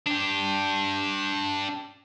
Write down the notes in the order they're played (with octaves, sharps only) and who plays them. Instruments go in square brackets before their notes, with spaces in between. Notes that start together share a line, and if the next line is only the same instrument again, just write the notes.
[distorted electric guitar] D4 G4